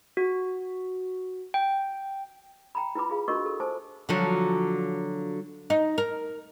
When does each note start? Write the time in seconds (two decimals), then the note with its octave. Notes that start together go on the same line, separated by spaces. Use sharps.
0.17 F#4
1.54 G5
2.75 G5 A#5 B5
2.95 E4 F4 B4 A#5 B5 D6
3.10 F4 G#4 F5
3.28 D4 F#4 A#4 D#5 C#6 D6
3.45 A4
3.60 C5 G#5 A5 D6
4.09 D3 F3 F#3
5.70 D#4
5.98 A#4